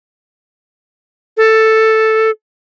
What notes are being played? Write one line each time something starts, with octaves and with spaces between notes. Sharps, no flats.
A4